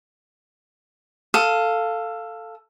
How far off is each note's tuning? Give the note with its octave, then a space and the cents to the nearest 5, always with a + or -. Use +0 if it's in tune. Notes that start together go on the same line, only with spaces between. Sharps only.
A4 +10 F5 +0 D#6 +25